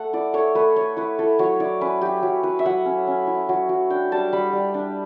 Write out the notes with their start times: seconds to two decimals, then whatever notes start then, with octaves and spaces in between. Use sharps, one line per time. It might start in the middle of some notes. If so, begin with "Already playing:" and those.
Already playing: A3 F#5 A5
0.13 E4 D5
0.34 A3 C#5
0.55 A3 B4
0.76 A3 C#5
0.97 E4 B4
1.19 E4 A4
1.39 F#3 C#5
1.60 E4 D5
1.81 C#4 B4
2.01 F#3 G4
2.23 F#3
2.43 E4 B4
2.59 E5
2.65 F#3 F#5
2.85 C#4
3.07 C#4
3.27 E4
3.49 F#3
3.69 F#3
3.90 D4 G5
4.12 G3 A5
4.33 G3 B5
4.53 G3
4.74 D4